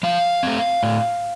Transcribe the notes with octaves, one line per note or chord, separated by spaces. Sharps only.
F3 F5
A3 C4
A2